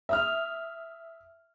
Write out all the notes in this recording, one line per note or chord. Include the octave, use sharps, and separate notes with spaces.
E5 D#6 F6